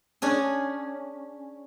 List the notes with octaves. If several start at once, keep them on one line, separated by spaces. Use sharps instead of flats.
C#4 D4 G#4